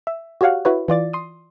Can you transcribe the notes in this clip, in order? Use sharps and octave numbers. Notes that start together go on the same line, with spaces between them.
E5
F#4 G4 C#5 F5 F#5
E4 F#4 B4 C#5
E3 F4 D5 A6
C6 D#6